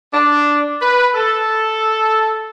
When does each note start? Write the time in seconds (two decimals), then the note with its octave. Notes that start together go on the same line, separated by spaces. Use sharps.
0.12 D4
0.81 B4
1.15 A4